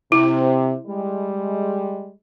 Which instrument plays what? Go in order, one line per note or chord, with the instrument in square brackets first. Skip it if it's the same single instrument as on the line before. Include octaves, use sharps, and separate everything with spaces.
[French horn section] C3 [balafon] E4
[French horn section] G3 G#3